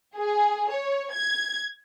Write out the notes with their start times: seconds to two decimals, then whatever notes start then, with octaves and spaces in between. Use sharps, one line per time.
0.16 G#4
0.71 C#5
1.13 G#6